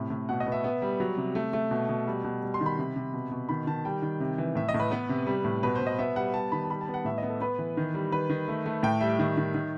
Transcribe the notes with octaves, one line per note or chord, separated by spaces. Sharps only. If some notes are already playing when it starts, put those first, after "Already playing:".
Already playing: A2 C3 B5
A2
B2 F#5
D#5
B3
E5
B3
G3
F#3
C3
A3
A3
B2
B2
G3
B2
G3
C6
D#3
B5
C3
C3
B2
B2
D#3 B5
D#3 A5
G3 G5
D#3
C3
E3
A2 E5
D#5
A2
B4
B3 B4
C3
G3
A2
B2 B4
C5
B2
D#5
B3 E5
G3 F#5
G3 A5
D#3 B5
A5
G3 B5
A5
B3
F#5
A2 E5
B3 D#5
A4
B3 B4
E3
D#3
G3
D#3 B4
D#3
A3
A3
A2 G5
G3 E5
D#3
D#3
D#3